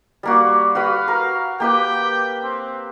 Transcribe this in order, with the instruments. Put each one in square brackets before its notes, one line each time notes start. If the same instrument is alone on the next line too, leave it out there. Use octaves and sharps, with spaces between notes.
[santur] G3 A#3 F#4
[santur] F#4 B4 B5 [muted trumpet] F5
[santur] A#4
[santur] A#3 G4 B4 [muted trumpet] G5
[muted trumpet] C4